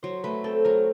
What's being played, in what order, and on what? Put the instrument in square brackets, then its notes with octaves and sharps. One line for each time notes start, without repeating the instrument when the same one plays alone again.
[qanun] F#3 [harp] C5
[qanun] A3 [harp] B4
[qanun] C4 [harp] A4
[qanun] F#3 [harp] A#4